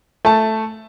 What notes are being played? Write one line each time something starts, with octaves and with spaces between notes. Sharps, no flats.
A3 A5